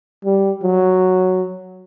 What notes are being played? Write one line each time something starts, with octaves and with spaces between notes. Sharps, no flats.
G3
F#3